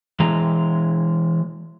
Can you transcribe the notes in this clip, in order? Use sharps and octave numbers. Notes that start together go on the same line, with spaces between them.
E3 G#3 A#5